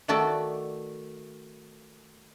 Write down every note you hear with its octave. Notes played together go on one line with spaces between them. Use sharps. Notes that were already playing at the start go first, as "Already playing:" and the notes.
D#3 A3 F#4 A4 D5